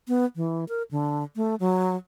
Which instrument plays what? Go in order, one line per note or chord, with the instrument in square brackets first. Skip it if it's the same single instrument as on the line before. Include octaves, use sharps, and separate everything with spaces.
[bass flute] B3
E3
A#4
D3
A3
F#3